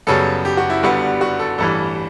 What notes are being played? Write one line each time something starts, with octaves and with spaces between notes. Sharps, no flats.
F#2 C#3 G3 B3 A4
G4
F#4
E4
G1 G2 D3 G3 B3 F#4
F#4
A4
A1 G2 E3 A4